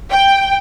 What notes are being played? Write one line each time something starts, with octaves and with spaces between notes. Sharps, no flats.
G5